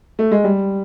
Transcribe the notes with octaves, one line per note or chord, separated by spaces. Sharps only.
A3
G#3
G3